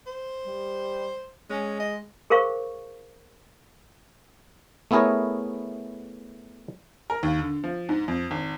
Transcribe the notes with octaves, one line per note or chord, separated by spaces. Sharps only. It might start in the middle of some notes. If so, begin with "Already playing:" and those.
C5
G3
G#3 C#4
D#5
G#4 A#4 C5 F5 C#6
A3 B3 E4 G#4 A#4 C#5
A#4
D#2
D3
F3
G#2
F2
G#1